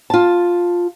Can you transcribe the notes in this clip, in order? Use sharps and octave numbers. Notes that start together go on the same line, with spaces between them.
F4 A5